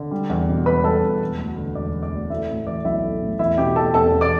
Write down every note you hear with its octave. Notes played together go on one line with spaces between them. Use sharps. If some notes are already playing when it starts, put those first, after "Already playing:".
Already playing: D3
G3
E2
B2
E1 B4 B5
G3 A4 A5
E2
E1
D2
D3
E1 D5
E1
D5
D2
A3 E4 E5
A2
E3 D5
B1 E4 E5
A3
A2
E2 E4 E5
B2 G4 G5
A3 A4 A5
E2 A4 A5
E2
D5 D6